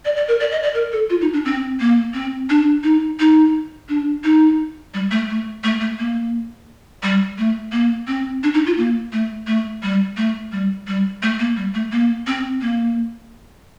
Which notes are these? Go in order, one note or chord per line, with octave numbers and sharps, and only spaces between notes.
D5
D5
A#4
D5
D#5
D5
A#4
A4
F4
D#4
D4
C4
A#3
C4
D4
D#4
D#4
D4
D#4
G3
A3
A3
A3
A3
A#3
G3
A3
A#3
C4
D4
D#4
F4
A#3
A3
A3
G3
A3
G3
G3
A3
A#3
G3
A3
A#3
C4
A#3